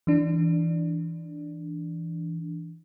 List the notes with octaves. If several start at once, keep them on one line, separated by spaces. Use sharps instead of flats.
E3 D4